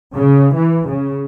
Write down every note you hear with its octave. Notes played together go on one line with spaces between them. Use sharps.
C#3
E3
C#3